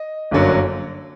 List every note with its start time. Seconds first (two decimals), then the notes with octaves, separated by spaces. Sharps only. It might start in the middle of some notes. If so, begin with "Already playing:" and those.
Already playing: D#5
0.31 G1 F#2 D3 F#3 A#3